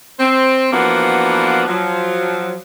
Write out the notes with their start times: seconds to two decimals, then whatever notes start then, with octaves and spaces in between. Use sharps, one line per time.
0.20 C4
0.73 E3 F3 A#3 B3 D4 F#4
1.68 F3 F#3